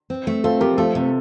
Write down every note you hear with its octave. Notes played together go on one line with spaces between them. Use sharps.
C4
A3
C4 F4 A4
F3 G4 A#4
A3 F4 A4
C3